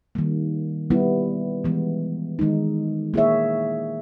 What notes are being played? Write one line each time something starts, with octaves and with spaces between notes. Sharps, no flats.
D#3 G3 A#3
G3 B3 E4
E3 G#3 B3
D#3 G#3 D#4
A#3 E4 G#4 C#5 E5